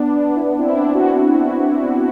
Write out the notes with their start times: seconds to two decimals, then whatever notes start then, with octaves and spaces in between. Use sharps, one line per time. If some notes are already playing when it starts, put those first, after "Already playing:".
Already playing: B3 D4
0.36 E4
0.41 B3 D4
0.59 C4 E4
0.77 B3 D4
0.94 D4 F#4